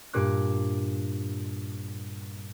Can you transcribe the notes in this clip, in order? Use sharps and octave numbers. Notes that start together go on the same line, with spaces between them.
G2 A#2 D6 F#6